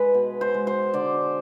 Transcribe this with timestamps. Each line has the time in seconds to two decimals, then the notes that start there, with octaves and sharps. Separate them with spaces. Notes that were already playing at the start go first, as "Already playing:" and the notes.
Already playing: G#3 B4
0.14 B2
0.41 C5
0.54 G#3
0.67 C5
0.94 D3 D5